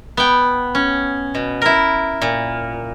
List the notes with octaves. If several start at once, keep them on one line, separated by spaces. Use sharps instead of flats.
B3 G5
C#4
B2
E4 A#4
A#2